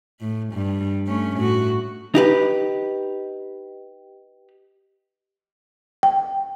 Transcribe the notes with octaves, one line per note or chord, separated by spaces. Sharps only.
A2
G2
A3 C#4
A2 F#4
D#4 G4 B4
G5